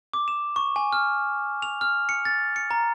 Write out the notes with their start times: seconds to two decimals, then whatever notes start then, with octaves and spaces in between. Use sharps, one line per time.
0.13 D6
0.28 E7
0.56 C#6
0.76 G#5
0.93 F6
1.62 F7
1.81 F6
2.09 C#7
2.25 A6
2.56 C#7
2.71 A#5